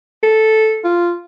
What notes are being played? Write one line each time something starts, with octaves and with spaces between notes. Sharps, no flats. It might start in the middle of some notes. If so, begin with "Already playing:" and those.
A4
F4